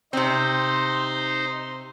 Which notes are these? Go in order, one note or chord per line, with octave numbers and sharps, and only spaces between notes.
C3 C4 D#4 C5